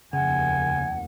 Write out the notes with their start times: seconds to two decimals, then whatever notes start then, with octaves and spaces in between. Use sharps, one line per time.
0.13 F1 D#2 C#3 F#5 G#5